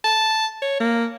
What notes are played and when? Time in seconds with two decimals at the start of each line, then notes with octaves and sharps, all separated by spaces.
0.05 A5
0.62 C#5
0.80 A#3